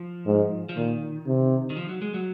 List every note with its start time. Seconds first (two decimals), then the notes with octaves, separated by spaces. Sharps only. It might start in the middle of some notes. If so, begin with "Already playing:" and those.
Already playing: F3
0.26 G#2
0.69 F3
0.76 A#2 D#3
1.27 C3
1.70 D#3
1.77 F3
1.89 F#3
2.02 G#3
2.14 F#3